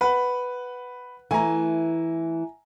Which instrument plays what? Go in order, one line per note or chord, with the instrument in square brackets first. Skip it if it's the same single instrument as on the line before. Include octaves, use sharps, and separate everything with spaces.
[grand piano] B4 F#5
[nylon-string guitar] E3 A3 [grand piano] G#5 A#5